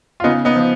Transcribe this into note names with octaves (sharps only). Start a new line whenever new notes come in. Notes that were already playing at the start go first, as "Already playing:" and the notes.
F4
C#3 B3 D#4
B3 D#4
F3